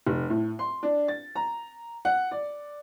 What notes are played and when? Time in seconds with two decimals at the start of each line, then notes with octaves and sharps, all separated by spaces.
0.07 F1
0.30 A2
0.59 C6
0.83 D4
1.08 A6
1.35 A#5
2.05 F#5
2.31 D5